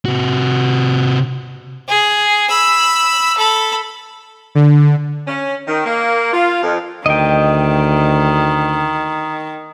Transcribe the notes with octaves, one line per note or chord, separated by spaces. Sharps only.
C3 F#4
G#4
B5 E6
A4 B5
D3
C#4
D#3
A#3
F4
F2
D2 D#3 D#5 G5